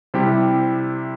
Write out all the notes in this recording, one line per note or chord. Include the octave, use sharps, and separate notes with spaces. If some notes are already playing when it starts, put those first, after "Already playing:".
C3 G3 E4 G4